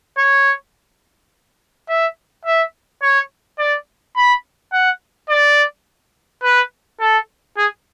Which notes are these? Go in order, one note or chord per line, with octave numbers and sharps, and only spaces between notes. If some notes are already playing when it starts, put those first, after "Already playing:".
C#5
E5
E5
C#5
D5
B5
F#5
D5
B4
A4
G#4